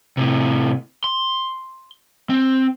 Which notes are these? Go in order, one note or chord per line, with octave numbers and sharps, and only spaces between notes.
A2 C3
C6
C4